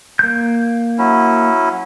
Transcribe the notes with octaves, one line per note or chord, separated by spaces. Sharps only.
A#3 G6
F#3 C#4 E4